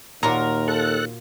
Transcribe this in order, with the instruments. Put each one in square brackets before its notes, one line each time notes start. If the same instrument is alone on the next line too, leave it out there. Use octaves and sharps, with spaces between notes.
[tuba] D#2 [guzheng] A#2 F4 F#4 [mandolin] A#4
[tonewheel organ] A4 F#6